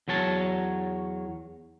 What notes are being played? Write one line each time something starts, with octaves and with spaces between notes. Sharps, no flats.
E2 F#3 C#5 A5